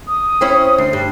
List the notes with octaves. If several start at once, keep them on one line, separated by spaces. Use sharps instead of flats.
D#6
C4 C#4 E4
D2 C7
G2